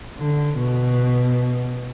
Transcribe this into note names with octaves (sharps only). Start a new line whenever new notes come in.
D3
B2